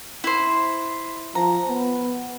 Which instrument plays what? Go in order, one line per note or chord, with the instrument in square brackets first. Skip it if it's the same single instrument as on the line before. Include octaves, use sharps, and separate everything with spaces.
[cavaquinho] E4 C5
[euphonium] F3 [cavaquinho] A#5
[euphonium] B3